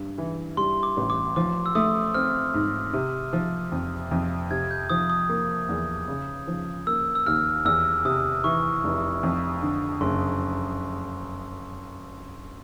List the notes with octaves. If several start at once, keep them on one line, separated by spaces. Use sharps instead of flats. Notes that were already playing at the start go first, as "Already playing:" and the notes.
Already playing: G2
E3
G3 C6
D6
A1
D6
F3 D6
E6
A3 D#6
C4 F6
G#2
C3
F3
F2
F2
C3 G#6
G6
F3 D#6
D#6
A#3
E2
C#3
F3
A#3 E6
E6
D#2 F6
E2 E6
C3 D#6
E3 C#6
F1
F2
D3
F#1 C6